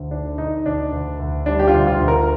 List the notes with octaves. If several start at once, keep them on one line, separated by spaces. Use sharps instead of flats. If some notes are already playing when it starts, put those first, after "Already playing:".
Already playing: D2
D3 D4
D3 D#4
D2 D4
D2
D2
G3 D4
G4
F4
D2
F4
D2
A#4